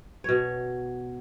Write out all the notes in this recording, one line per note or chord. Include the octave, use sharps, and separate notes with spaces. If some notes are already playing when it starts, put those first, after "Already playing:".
B2 C#5